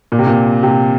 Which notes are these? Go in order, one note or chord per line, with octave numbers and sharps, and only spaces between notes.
A#2
C3
A#2
C3